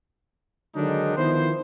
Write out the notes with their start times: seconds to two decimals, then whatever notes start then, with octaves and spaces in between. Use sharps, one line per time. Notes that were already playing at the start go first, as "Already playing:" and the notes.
0.76 D3 D#3 F#3 G#3 D4 D#4
1.17 D#3 F3 B3 E4 C5